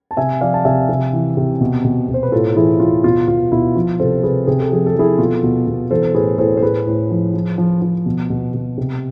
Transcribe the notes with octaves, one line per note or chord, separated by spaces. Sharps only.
A5
C3 E5 G#5
F3 D5 F5
A5
C3 E5 G#5
C3
E3
C3
B2
B2
B2
C5
B4
A2 F4 A4
E3 E4 G#4
E3 F4
B2 F4
B2 F4
B2 E4
F3 F4
C3 A4 C5
C3 G#4 B4
C3 G#4
A4
F3 G#4
A4
F3 E4 G#4
B2 F4 A4
B2
B2
E3 A4 C5
A2 G#4 B4
A2 A4 C5
C5
A2 G#4 B4
A2
F3
F3
F3
F3
B2
B2
B2
C3